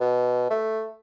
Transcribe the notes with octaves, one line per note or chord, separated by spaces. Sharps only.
B2
A3